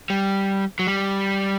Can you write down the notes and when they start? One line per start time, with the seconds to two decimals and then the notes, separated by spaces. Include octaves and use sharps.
0.10 G3
0.79 F#3
0.87 G3